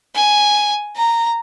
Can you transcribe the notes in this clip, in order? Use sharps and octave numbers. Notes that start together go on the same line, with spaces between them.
G#5
A#5